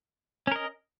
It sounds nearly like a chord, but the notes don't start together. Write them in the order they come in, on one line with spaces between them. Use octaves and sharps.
C#4 A#4 D#5